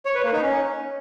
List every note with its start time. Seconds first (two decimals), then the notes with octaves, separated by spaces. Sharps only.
0.05 C#5
0.15 B4
0.24 A#3
0.33 D#4
0.42 C#4